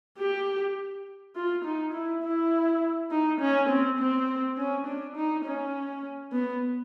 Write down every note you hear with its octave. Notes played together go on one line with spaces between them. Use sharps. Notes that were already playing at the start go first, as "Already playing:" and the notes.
G4
F4
D#4
E4
E4
D#4
C#4
C4
C4
C#4
D4
D#4
C#4
B3